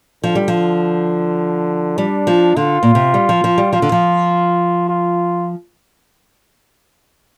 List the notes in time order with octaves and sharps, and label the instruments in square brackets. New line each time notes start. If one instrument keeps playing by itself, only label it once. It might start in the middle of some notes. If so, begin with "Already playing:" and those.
[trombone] D3 [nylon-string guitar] F3
[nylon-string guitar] G3
F3
[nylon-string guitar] G3 [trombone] D4
[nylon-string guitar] F3
[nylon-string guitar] D3 [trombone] F4
[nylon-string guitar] A#2
C3
G3
F3
F3
G3
[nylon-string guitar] F3 [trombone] F4
[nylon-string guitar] D3
F3
[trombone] F4